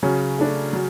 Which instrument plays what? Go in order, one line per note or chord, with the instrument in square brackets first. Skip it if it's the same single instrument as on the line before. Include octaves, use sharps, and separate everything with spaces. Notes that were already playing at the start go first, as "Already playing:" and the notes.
[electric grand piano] C#3 C#4 [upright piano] F#3
[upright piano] A3 D4
F#3